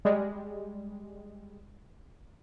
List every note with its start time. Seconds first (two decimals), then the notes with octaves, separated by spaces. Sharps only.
0.05 G3 G#3